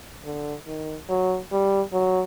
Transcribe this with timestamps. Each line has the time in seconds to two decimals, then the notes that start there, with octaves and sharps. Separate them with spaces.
0.25 D3
0.67 D#3
1.09 F#3
1.52 G3
1.93 F#3